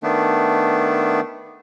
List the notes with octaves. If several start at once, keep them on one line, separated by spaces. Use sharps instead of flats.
D#3 A3 B3 D4